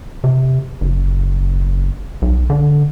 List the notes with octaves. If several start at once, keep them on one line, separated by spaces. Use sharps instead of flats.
C3
F#1
B1
D3